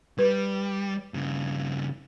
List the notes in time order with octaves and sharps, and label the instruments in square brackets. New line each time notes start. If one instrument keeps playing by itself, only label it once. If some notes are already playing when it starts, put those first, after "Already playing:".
[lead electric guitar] G3 [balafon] B4
[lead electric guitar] G2 C#3